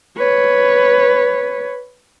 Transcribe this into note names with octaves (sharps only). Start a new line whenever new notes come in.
B4 C#5